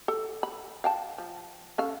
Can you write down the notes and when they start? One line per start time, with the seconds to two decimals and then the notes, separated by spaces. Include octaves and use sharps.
0.08 A4
0.43 B5
0.84 F5 G5 A5
1.18 F3
1.78 C#4 A4 F5